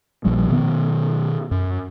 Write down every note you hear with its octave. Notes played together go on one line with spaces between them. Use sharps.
A#1 F3 G3
B2 D#3 B3
F#2